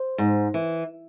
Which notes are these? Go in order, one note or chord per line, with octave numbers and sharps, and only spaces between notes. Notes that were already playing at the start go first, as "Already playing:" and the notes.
Already playing: C5
G#2
E3